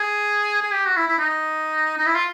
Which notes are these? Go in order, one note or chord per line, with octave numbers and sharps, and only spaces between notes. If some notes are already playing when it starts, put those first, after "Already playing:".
Already playing: G#4
G#4
G4
F#4
E4
E4
D#4
D#4
E4
F4